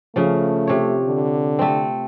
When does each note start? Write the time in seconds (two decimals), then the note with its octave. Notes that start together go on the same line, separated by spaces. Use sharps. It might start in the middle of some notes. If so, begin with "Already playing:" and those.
0.16 C#3 F3 A3
0.67 C3 C#5
1.05 D3
1.59 A3 C4